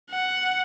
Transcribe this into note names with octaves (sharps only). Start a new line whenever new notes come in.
F#5